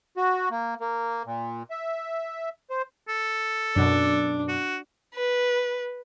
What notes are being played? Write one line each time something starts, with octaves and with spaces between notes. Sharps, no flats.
F#4
A#3
A#3
A#2
E5
C5
A4
F#2 B2 D4
F#4
B4